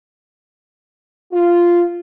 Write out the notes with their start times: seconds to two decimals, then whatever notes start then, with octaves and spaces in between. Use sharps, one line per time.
1.33 F4